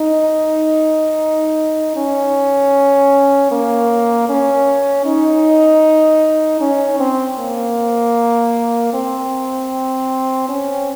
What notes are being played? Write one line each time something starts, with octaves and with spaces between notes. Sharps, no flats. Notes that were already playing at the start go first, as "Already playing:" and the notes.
Already playing: D#4
C#4
A#3
C#4
D#4
C#4
C4
A#3
C4
C#4